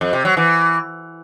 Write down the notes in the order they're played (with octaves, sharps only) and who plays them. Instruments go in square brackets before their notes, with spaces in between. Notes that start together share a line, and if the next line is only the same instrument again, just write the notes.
[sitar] F2
C3
F#3
E3